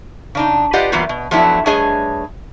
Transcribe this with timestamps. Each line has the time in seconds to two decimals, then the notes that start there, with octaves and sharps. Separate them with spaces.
0.35 C#3 D4 D#4
0.73 F4 G4 B4 D5 D#5 F#5
0.92 E3 F#3 G3 A#3 B3 F4
1.09 B2
1.31 F3 F#3 A3 B3 D4 E4
1.66 G2 A3 D4 G#4 C#5 D#5